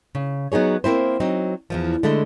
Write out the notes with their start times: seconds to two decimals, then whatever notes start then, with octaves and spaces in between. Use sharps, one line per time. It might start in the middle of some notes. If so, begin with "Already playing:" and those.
0.15 C#3
0.52 F#3 B3 D#4 G#4 C#5
0.84 A#3 C4 E4 C5
1.20 F#3 C4 D#4
1.70 E2 G2 F3
2.03 D3 G#3 A3 E4